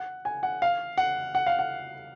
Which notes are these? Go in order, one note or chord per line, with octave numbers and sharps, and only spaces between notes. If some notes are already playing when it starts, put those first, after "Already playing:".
Already playing: F#5
G#5
F#5
F5
F#5
F#5
F5
F#5